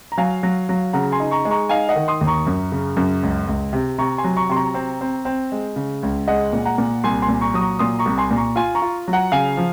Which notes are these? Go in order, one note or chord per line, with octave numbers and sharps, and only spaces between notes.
A#5
F#3 F5 G#5
F#3
F#3
C#3 F#5 A#5
G#5 C6
D#4
A#5 C#6
G#3
A#5 C#6
D#4 F5 G#5
D#5 F#5
D#3
C6 D#6
D#2
A#5 C#6
F#2
C#3
F#2
C#2
C#2
C3
C3 A#5 C#6
G#5 C6
F#3
A#5 C#6
C3 C6
A#5 C#6
C4
C4
C4
G#3
C#3
C#2
G#3 D#5 F#5
A#2
F#5 A#5
A#2
C2 G#5 C6
G#5 C6
A#2
A#5 C#6
F#3 D#6
A#5 C#6
A#2 C6 D#6
A#5 C#6
C2
G#5 C6
A#2
A#5 C#6
F4 G#5 C6
A#5 C#6
F4
F#3
F#5 A#5
C#3 F5 G#5
F3